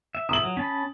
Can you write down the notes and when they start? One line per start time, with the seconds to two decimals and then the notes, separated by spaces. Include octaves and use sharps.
0.15 E5
0.29 E5 D#6 F#7
0.43 F#3
0.57 C#4 A5 B5